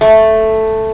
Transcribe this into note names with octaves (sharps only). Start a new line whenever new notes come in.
A3